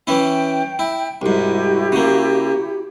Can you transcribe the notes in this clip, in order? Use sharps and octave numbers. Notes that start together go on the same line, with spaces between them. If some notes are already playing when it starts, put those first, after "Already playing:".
E3 C#4 E4 G5
E4
C2 G#2 E4 F#4 G4
C#3 A#3